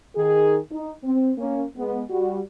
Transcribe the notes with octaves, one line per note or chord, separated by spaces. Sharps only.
D#3 G#4
D#4
C4
A#3 C#4
G#3 B3
G3 F#4